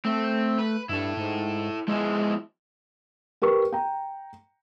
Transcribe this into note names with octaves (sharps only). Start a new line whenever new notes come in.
A3 C4
B4
G2 E4 A4
G#2
F3 G#3 B3 E4
G4 A#4 B4 C#6
G5 A#5